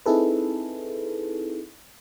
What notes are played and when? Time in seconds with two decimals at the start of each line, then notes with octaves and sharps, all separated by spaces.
0.06 C4 D#4 E4 G#4 A4 B4